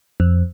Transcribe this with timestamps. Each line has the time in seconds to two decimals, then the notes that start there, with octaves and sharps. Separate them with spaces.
0.20 F2